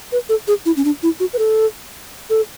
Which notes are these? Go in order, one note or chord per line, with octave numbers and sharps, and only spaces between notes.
B4
A4
G#4
E4
C#4
D4
E4
F#4
B4
A4
A4